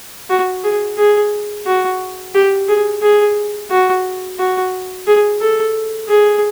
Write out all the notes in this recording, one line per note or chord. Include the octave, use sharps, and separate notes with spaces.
F#4
G#4
G#4
F#4
G4
G#4
G#4
F#4
F#4
G#4
A4
G#4